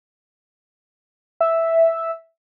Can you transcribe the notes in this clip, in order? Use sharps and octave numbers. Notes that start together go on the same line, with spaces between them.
E5